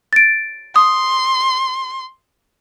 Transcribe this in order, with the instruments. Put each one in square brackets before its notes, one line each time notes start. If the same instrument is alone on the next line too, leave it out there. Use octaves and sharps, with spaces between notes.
[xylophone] A6 D7
[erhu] C6 [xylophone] D#6